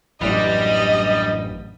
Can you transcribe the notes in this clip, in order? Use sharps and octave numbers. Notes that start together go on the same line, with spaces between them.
A1 F#2 E3 G3 D4 D5 D#5